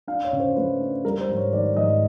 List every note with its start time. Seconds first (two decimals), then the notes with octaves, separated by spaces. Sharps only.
0.07 D4 F5
0.24 C#5
0.33 C#3
0.40 C5
0.56 A3 B4
0.81 D4
1.04 G3 A#4
1.21 C5
1.29 G#2
1.37 C#5
1.52 D#3 D5
1.77 G#2 D#5